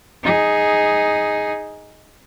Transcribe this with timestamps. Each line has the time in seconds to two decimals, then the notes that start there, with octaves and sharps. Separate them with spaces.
0.23 D#4 G#4